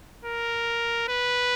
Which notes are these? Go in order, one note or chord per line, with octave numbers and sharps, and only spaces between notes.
A#4
B4